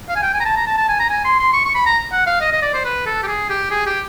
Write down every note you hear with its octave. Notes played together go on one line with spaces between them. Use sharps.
F5
G#5
G5
G#5
A#5
A5
A#5
A5
A5
G#5
A#5
G#5
C6
C6
C#6
C#6
B5
A#5
F#5
F5
D#5
D#5
D5
C5
B4
A4
G4
G#4
G4
G#4
G4